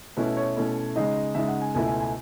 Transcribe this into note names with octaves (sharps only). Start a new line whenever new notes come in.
B2 A3 C#4 E4 B4
C#5
B2 A3 C#4 E4
C#3 G#3 D#4 D#5
C#3 G#3 D#4 E5
F#5
G#5
C#2 B2 A3 E4 G#5
G#5
G#5